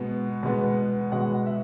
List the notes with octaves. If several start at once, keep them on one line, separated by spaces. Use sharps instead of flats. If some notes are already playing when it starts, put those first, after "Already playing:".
Already playing: B2 G#3 B3
B2 G#3 B3
B2 G#3 B3 F#5
E5